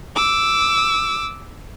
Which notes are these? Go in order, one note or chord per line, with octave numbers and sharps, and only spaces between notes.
D6 E6